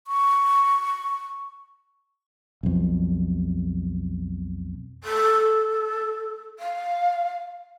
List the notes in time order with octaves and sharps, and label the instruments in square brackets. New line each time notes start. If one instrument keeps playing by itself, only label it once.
[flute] C#6
[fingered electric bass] B1 F2
[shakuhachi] A4
F5